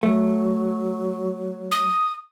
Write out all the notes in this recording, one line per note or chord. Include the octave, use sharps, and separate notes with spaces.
F#3 A3
D#6